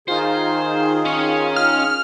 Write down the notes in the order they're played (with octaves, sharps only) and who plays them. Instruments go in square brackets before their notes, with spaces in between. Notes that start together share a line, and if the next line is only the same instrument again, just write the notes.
[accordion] D#3 G#4 [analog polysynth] D#4 F4 [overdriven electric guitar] C5
[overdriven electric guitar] C#4 C#5
[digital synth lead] F6